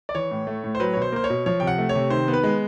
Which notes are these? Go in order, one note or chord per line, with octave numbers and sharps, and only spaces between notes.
D5
E3 C#5
A2
A3
A2
C5
F#3 B4
B2 C#5
C5
A#3 C5
C#5
B2
F3 C#5
C3 G5
F#5
A3
C#5
C3
D#3 C5
B3
B4
G#3